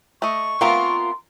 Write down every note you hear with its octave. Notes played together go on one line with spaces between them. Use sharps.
A3 D#5 C#6
A3 B3 C4 F4 A#4 C6